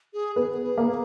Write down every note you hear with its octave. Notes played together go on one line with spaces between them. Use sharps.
G#4
B3 G#4
A#3